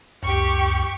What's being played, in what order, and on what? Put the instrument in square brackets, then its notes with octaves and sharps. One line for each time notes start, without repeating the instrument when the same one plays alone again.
[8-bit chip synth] C#2 F#2 [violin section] G4 C#6